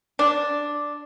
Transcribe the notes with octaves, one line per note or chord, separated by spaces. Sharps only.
D4